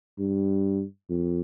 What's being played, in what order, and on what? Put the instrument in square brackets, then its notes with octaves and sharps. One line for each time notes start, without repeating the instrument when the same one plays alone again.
[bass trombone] G2
F2